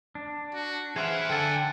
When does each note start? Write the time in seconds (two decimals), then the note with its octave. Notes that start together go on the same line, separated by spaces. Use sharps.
0.15 D4
0.54 F#4
0.96 E3 E4 G#4 C5 F5 F#5
1.30 D3 A4 G5 G#5